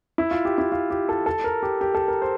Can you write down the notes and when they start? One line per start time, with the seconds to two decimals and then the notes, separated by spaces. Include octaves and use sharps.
0.18 E4
0.31 F4
0.45 G4
0.58 E4
0.72 F4
0.90 G4
1.09 A4
1.26 A4
1.44 A#4
1.63 G4
1.81 G4
1.94 A4
2.08 A#4
2.22 C5